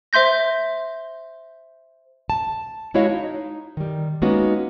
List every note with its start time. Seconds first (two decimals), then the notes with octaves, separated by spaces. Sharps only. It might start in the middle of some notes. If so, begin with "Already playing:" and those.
0.13 C5 E5 C6 G6 A#6
2.30 A5
2.94 G#3 E4 F#4 C#5 D#5 F5
3.10 D#4
3.77 D#3 G3
4.22 G#3 A#3 B3 C#4 D#4 F#4